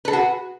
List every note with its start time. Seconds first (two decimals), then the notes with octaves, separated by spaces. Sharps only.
0.05 B4
0.08 A4
0.10 G#4
0.13 F#4